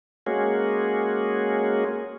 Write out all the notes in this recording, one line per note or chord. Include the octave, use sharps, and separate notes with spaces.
G#3 A#3 C#4 F#4 G#4